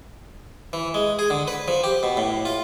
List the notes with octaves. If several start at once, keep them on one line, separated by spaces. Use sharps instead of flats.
E3
G#3
G#4
D3
B4
F3
G4
B2
A2
F4